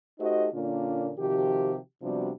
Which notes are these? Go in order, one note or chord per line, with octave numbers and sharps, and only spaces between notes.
A3 D#4 F#4 G4 C5 D#5
A#2 D3 A#3 C#4 D4 F4
C3 D#3 F3 F#4 G4
C3 F3 G3 B3 D4 F#4